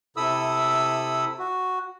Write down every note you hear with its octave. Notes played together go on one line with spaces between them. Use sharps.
C3 E4 A4 B5 D#6 E6
F#4